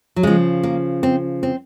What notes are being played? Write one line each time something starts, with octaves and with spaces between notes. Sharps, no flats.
F#3
C#3 F3 G#3
A#3
C4
C4